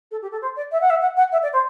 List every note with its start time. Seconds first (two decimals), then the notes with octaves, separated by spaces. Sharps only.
0.11 A4
0.22 G4
0.32 A4
0.42 C5
0.56 D5
0.72 E5
0.81 F#5
0.90 E5
1.01 F#5
1.17 F#5
1.32 E5
1.43 D5
1.53 C5